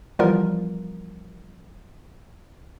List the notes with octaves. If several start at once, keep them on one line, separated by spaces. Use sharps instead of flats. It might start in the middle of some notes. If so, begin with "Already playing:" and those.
E3 F3 G3 B3 F4 A#4